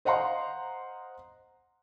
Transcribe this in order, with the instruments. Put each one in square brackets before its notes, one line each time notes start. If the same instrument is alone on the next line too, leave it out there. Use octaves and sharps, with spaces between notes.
[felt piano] C5 D#5 F5 F#5 A#5 C6